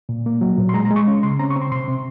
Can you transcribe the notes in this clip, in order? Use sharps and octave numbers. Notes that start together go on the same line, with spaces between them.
A#2
A#3
F#3
A#2
C6
G#3 A#5
A#5
G#3
C#6
C#4
C#3 C6
C4 A#5
C#6
C4
C6
C3 C6
C3